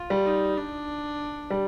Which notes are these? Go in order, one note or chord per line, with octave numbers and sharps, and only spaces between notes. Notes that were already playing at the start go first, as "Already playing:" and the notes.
Already playing: F4
G3
D#4
D4
G3